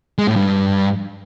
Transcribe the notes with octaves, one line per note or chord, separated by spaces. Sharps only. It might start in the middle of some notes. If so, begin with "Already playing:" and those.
G#3
A2
G2